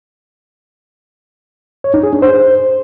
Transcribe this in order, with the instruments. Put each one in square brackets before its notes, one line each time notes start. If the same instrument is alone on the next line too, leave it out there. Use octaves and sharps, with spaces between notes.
[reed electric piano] C#5
D#4
G#4
D4
C5